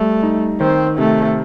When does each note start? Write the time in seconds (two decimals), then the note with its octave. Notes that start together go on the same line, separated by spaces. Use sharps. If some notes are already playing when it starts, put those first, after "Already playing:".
Already playing: G3 A3
0.23 D#4
0.60 D#3 C4
0.98 C3 A3